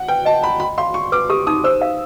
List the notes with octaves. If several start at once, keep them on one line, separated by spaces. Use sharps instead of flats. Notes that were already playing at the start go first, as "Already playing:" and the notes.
Already playing: F#5
B4 G5
D#5 A5
A#5 B5
F#4 B5
F5 C6
F#4 C#6
B4 D6
G4 D#6
D#4 D#6
C5 E6
F5